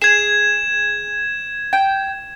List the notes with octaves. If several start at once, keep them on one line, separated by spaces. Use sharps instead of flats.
G#4 G#6 E7
G5